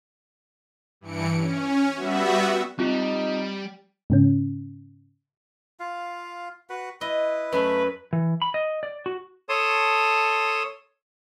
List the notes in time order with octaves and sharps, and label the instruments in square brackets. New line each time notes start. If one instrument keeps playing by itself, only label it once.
[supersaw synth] G2 E3 C#7 D7
C#4
G3 B3 F#4 E5
[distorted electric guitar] G3 [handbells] C4 F4 [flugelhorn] D#4
[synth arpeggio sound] G#2 C#3 C#4
[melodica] F4 F5
F#4 B4 F#5
[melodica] E4 B4 [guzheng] D#5
[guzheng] F#2 [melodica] A3 E5 [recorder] B4
[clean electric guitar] E3
B5
D#5
D5
F#4
[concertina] A4 C#5 A5 C6 D#6